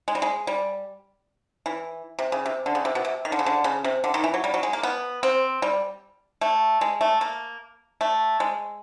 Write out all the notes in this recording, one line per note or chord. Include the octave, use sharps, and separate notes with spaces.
G#3
G3
G#3
G3
E3
C3
C#3
C3
D3
C#3
C3
B2
C3
D#3
D3
C#3
D3
C#3
C3
D3
D#3
E3
F#3
G3
F#3
G#3
A#3
B3
C4
G3
A3
G#3
A3
A#3
A3
G#3